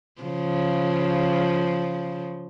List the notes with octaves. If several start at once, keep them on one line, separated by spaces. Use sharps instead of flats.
C#3 F3